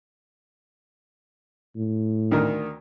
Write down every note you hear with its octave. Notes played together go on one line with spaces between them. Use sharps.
A2
D2 D#3 A#4